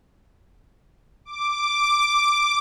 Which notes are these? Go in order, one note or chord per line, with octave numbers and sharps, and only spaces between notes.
D6